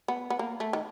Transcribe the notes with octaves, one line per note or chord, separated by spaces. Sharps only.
B3
B3
A#3
A3
D#3